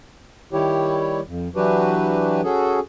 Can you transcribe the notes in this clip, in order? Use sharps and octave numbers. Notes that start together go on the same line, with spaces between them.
D#3 G3 E4 G4 C#5
F2
E3 F#3 D4 F#4 G4 B4
C#4 F#4 G#4 A4